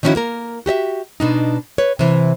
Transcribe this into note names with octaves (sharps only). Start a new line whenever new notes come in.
D#3 F3 C#4 D4 E4 F#4
A#3 A#4
F#4 G4 D#5 E5
B2 D4 D#4
B4 C#5
C3 E3